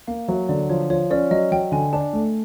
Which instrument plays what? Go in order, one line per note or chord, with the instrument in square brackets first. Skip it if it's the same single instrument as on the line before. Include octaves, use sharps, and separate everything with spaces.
[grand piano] A#3 [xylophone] F5
[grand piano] F#3 [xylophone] E5
[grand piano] D3 [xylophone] D5
[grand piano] F3 [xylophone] C#5
[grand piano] F3 [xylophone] C#5
[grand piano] C#4 [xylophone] D5
[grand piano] F#3 [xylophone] D#5
[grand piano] F#3 [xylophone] G5
[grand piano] D3 [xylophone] G#5
[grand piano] D4 [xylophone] A5
[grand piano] A3